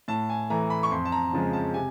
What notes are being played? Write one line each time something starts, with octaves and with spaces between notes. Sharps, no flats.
A2 A5
G#5
E3 A3 A#5
B5
C#6
F2 C6
A5
A#5
C#3 F3 G#3
A5
C3 G#5